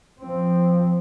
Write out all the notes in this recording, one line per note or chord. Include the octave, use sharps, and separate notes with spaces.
F3 C4